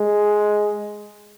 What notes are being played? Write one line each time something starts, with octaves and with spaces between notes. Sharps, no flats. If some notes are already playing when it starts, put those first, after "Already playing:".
Already playing: G#3